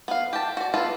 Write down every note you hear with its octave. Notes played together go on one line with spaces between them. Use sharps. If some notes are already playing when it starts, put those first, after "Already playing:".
B3 F5
G4 A5
F#4 D5
B3 E4 F4 A4 B4